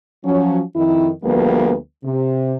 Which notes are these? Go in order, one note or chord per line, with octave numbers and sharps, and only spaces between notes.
F3 F#3 C#4
F2 D#3 E4
D2 F3 G3 A#3 B3 B4
C3